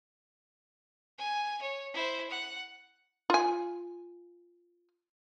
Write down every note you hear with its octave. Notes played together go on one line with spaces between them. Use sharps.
G#5
C#5
E4 C5
F#5
F4 G#5